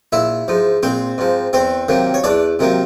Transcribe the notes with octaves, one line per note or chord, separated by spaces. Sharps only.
A#1 E4 E5
G#2 F3
A#1 C4 C5
G#2 F3
E2 C4 C5
C3 D#3 F#3 A#3
C#5
E2 D4 D5
C3 D#3 F#3 A#3